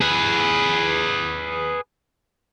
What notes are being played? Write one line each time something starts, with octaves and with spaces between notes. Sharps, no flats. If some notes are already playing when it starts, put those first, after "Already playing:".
G#4 B4